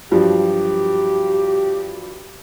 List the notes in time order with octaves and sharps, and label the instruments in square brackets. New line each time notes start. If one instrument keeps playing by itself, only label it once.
[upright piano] G2 F3 F#3 [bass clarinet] G4